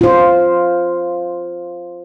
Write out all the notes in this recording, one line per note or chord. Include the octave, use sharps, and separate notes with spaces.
F4 C5